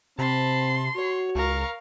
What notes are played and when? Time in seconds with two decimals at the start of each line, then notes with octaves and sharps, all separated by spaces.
0.19 C3 C4 A5 B5 C6
0.96 F#4 C#5
1.35 C#2 A#4 F5 C#6